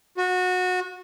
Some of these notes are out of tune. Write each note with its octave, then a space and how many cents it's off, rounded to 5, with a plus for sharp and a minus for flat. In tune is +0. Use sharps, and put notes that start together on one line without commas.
F#4 -20